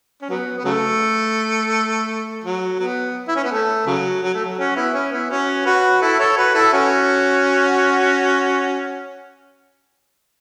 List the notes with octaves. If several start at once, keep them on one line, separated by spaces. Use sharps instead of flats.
C#4
F#3 B3
B3
C#3 F#3 A3
F#3
F#3 B3
E4
C#4
B3
A3
C#3 F#3
F#3
A3
F#3
C#4 F#4
B3 E4
C#4
B3 E4
C#4 F#4
F#4 B4
E4 A4
A4 C#5
F#4 B4
E4 A4
C#4 F#4